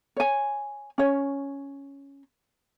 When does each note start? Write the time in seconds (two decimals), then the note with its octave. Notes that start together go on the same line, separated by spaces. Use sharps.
0.17 C#5 G#5
0.98 C#4 C#5